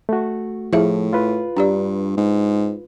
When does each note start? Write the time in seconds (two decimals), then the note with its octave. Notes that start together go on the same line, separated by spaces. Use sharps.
0.09 A3 F#4
0.73 A2 F3 E4 G#4 E5
1.13 F4 B4
1.57 G2 D4 G4 D5
2.17 G#2